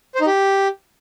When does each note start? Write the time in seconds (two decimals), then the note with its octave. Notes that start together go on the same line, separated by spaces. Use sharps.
0.15 C5
0.21 D#4
0.27 G4